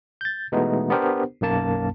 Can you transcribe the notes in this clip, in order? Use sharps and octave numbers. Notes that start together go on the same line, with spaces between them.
G6 A6
B2 E3 G#3 A3 B3 D#4
B3 D4 G4 A#4 C5
B1 F#2 A#3 A5